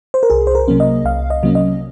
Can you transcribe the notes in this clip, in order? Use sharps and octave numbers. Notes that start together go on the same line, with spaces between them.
C5
A#4
C2 G#4
C5
A#4
C3 F#3 A#3 C#4
D#5
C2 F5
D#5
C3 F#3 A#3 C#4
D#5